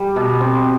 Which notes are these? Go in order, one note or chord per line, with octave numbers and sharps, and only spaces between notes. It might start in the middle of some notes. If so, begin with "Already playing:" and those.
Already playing: G3
B2
C4